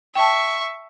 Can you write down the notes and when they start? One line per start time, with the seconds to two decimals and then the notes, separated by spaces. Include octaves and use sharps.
0.15 E5 G5 A5 C#6